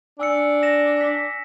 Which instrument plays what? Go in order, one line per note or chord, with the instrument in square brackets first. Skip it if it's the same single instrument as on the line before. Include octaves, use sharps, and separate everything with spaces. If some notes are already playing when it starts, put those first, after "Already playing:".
[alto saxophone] D4 [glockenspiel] G#5 E6 C#7
[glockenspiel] A#6 E7
B6